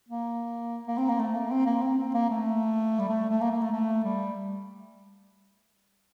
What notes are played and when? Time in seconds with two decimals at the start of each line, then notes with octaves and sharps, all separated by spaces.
0.09 A#3
0.88 A#3
0.98 C4
1.09 A#3
1.19 A3
1.35 A#3
1.51 C4
1.66 A#3
1.82 C4
1.98 C4
2.14 A#3
2.30 A3
2.99 G3
3.09 A3
3.30 A3
3.41 A#3
3.52 A#3
3.62 A3
3.72 A3
4.04 G3